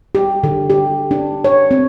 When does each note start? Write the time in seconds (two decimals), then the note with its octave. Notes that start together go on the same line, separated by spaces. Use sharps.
0.15 G4
0.44 D3
0.70 G4
1.11 D4
1.44 C#5
1.71 C4